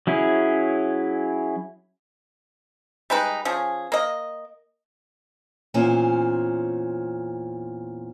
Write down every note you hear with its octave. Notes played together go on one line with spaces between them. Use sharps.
F#3 C#4 E4 G#4
G3 G#3 D#4 B4
F3 C#4 G#4
A#3 D#5
E2 A#2 C#4 C5 G#5